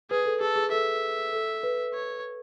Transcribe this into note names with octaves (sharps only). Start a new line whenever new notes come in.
G#4 B4
A4
G#4 A4
G#4
A4 E5
A4
B4
C#5